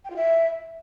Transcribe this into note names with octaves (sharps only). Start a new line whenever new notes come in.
G5
F4
E5